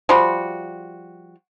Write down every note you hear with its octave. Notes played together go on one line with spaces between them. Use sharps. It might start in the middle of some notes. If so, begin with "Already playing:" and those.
F3 G3 F#4